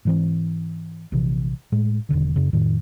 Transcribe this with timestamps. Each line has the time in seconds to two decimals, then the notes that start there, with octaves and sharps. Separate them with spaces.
0.05 G#2 E3 C4
1.12 A#1 C3 E3
1.72 A2 G#3
2.09 E1 C#2 D3 D#3
2.36 F#2 C#3
2.53 F2 A2 D#3